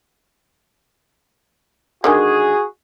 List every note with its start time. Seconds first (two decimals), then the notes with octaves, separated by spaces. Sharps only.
2.04 D3 D#3 G#3 F#4 G#4